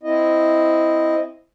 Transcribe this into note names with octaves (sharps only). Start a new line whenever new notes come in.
C4 E4 D#5